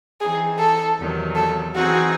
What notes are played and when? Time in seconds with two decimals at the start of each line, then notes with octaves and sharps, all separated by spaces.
0.21 E3 C4 D#4 G#4
0.59 A4
0.98 E2 C3 D#3 F#3
1.36 A4
1.75 E3 C4 D#4 F#4 G#4